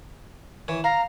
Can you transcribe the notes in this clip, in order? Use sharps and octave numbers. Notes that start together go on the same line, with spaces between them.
E3 C#5
F5 A#5